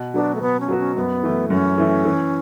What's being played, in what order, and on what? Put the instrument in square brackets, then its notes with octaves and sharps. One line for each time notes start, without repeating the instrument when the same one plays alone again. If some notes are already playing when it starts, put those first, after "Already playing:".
Already playing: [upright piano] B2
[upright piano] F#3 B3 F#4 [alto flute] D4
[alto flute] A3
[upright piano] B2 [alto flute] B3
[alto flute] C#4
[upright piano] F#3 B3 F#4
[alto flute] C#4
[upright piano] F#2 [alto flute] B3
[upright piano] E3 A3 E4
[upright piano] F#2 [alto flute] C#4
[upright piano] E3 A3 E4
E3